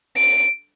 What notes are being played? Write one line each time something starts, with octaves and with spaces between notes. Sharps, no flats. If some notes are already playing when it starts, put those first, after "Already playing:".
D7